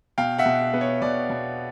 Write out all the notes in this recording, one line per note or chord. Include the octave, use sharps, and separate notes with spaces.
B2 F5 G5
E5 F#5
B2
B3
C#5
B2 D5
B2